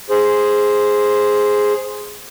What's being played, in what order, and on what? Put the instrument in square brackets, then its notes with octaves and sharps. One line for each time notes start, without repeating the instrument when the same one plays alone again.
[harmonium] G#4 C5